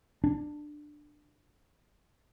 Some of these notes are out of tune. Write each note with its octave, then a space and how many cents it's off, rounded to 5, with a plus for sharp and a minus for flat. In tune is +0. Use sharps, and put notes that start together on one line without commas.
D4 +15